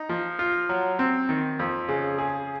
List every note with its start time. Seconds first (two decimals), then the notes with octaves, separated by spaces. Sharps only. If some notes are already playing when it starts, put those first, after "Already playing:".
Already playing: D#4
0.09 F3
0.39 F4
0.69 F#3
0.99 C4
1.29 D#3
1.59 F2
1.89 C#3
2.18 G#4